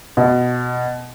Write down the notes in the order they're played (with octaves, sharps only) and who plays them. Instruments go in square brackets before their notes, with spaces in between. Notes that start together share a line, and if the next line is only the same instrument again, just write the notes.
[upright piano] B2